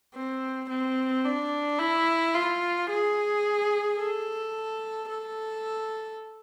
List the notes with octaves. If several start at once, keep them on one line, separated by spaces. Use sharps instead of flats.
C4
C4
D4
E4
F4
G#4
A4
A4